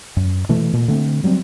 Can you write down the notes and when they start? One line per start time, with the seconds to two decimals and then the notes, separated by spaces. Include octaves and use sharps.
0.17 F#2
0.49 B2 E3 A3
0.73 A#2
0.88 D3 A3 C4
1.24 F#3 G3 A#3 C4